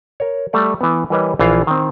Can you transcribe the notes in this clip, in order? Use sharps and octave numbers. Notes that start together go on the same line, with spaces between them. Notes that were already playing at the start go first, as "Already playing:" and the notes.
A#4 C#5
G3 A3 D5
E3 B3
E3 G3 A#4 B4 C#5 D#5
A#1 E3 F4 F5
D#3 C4